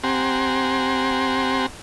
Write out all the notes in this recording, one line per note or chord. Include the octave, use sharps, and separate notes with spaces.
C4 G4 F#5 G#5 A#5 C6